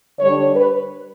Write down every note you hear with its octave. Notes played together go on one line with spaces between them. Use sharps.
D3 G3 D4 C#5
B4